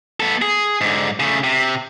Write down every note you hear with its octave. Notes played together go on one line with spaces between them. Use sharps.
B3 A4
G#4
G#2 D3
C#3 A3
C3